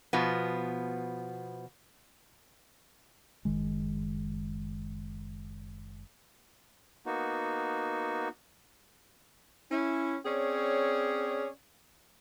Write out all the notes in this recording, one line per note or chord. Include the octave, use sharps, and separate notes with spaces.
B2 F3 B3
F#1 D#3 G#3
A#3 B3 D#4 F#4
C#4 E4
C4 C#4 G#4 C#5 D5